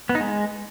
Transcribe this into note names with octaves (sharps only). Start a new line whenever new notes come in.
B3
D#4
G#3